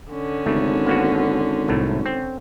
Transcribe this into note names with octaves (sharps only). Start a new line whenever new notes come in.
D3 C#4
G#1 C#3 A3
A#3 B3 F#4
C2 A2 A3
C4